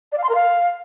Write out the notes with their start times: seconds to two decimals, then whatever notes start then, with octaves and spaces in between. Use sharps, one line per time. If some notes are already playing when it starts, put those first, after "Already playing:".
0.12 D5
0.17 F5
0.23 C6
0.29 A#4
0.34 F5